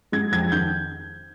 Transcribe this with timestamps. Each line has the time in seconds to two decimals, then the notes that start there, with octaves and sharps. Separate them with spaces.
0.12 G#3 G#6
0.32 F2 G#6
0.52 D#3 G6